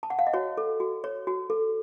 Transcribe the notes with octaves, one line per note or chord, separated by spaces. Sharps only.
A5
F#5
F5
D#5
F#4 C#5
A4
F#4
C#5
F#4
A4